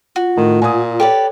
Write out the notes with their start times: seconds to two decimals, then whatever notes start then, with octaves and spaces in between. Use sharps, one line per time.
0.16 F4 F#4
0.37 A2 D#3 A3
0.62 A#2 G#5 D#6
1.00 G4 A4 B4 C#5 D5